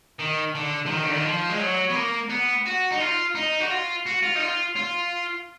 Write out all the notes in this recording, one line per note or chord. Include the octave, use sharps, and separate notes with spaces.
D#3
D3
F3
D#3
D3
D#3
F3
G#3
F#3
B3
A#3
B3
F#4
D#4
F4
D#4
F#4
F4
F#4
F4
D#4
F4
F4